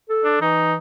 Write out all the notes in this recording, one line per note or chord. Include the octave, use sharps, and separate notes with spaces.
A4
D4
E3 D#4